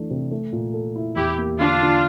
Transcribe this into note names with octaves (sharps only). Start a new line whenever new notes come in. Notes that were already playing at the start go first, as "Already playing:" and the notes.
Already playing: E3 A3 D4
C3
A3
A#2
A4
E4
E2 E4 G4
A#3
D3 D4 F4
D3